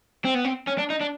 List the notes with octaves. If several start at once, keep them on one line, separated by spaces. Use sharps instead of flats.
C4
B3
C4
C#4
D4
D#4
D4